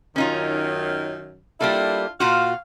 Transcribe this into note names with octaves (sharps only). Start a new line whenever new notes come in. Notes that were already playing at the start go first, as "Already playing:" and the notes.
F#2 D#3 C#4 D#4 F4
G3 A#3 D4 E4 F4 A4
A#2 F4 F#4 F5